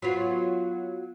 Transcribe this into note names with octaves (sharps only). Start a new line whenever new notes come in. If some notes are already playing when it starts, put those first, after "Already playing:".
F#3 B3 F4